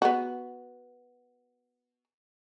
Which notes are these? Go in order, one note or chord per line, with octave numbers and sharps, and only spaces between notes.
B3 F#4